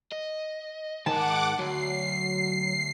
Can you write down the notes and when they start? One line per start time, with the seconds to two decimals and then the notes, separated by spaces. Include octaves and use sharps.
0.11 D#5
1.06 G#2 D#3 G#4 F#5 A5 D6
1.58 D2 F#3 C7